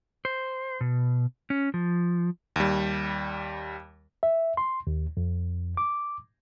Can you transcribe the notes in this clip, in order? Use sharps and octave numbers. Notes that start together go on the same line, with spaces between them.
C5
B2
C#4
F3
D#2 G3
E5
C6
D#2
F2
D6